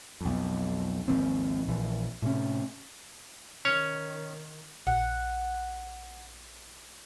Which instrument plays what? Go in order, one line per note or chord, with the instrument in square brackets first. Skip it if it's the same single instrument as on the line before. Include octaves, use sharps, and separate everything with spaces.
[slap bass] B1 F2
G#1 D#2 F3 C4
A#1 E3
A2 C3 C#4
[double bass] D#3 [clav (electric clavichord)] C#4 C#5
[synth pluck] A#1 [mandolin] F#5